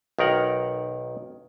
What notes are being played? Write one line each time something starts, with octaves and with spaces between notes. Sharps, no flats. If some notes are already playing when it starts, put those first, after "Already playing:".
B1 D#3 A#4 F#5